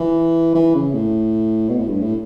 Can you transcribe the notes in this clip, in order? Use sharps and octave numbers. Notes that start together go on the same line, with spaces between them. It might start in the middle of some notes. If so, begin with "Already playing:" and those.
Already playing: E3
E3
C#3
A2
B2
A2
G2
A2